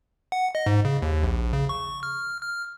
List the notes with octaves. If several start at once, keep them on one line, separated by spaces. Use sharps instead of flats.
F#5
D#5
G#2
C#3
D#2
A#1
C#3
C#6
F6
F6